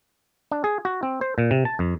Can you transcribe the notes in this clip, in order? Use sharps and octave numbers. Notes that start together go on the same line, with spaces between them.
D4
G#4
F#4
C4
C5
A#2
C3
A5
F2